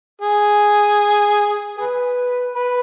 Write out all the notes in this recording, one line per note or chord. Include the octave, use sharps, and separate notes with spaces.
G#4
G#4 B4
B4